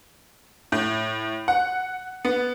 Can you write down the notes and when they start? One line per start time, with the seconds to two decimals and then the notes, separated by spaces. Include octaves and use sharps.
0.72 A2
1.48 F#5
2.25 B3